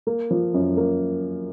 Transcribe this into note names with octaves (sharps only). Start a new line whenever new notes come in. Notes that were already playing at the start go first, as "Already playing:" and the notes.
A#3
F3
F#2
A#3